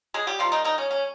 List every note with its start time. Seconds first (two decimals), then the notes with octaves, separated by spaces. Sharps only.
0.14 G#3 G#4
0.27 G3 G4
0.39 D#3 F3 G3 A#3 F4
0.52 D#3 D#4
0.64 D#3 D#4
0.78 C#4
0.91 C#4